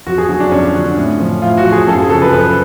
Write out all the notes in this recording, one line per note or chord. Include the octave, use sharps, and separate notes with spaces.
F2 F#4
G#4
D3 F#3 F#4
D4
F2 C#4
D3 F#3
A2
F3
A2 F4
F#4
F3
G#4
F#2 A4
G#4
C#3 F3 A4
B4
F#2 B4